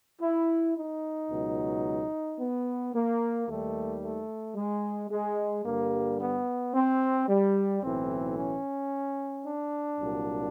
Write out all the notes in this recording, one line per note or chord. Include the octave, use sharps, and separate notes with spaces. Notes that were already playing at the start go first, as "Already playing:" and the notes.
E4
D#4
C#2 B2 F#3
B3
A#3
D#2 D#3 G3 A3
A3
G#3
G#3
G2 D3 G3 A#3
B3
C4
G3
B1 A2 E3 C4
C#4
D4
C2 A#2 F#3